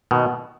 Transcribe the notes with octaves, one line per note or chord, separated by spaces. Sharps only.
B2 D#3